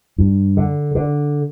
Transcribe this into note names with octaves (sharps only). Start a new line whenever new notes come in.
G2
D3
D3